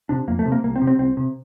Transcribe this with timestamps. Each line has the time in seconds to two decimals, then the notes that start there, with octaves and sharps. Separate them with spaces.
0.09 C3 D4
0.28 F2 A#3
0.39 A3
0.46 C3
0.52 A#3
0.64 C2 A#3
0.76 C4
0.82 C3
0.87 C4
0.99 C2 C4
1.17 C3